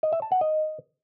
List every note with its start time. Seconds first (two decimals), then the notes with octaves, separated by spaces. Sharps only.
0.03 D#5
0.13 E5
0.22 A5
0.32 F#5
0.41 D#5